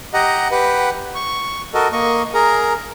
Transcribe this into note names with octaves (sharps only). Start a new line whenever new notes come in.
G4 D#5 F#5 A#5
G4 B4 F#5
C#6
F#4 A4 A#4 D#5
A#3 D#5 C#6
G#4 A#4 A#5